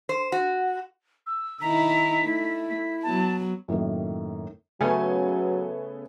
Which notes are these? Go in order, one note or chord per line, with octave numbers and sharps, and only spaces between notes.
C5
F#4
E6
D#3 D#4 E4 A#5 B6
A3 E4
B6
F#3 B3 A5
F#2 A2 D#3 A#3
C#3 F#3 A3 B3 C#4 A4 G#5